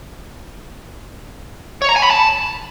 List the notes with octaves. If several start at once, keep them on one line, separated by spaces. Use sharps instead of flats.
C#5
A#5
G#5
B5
A5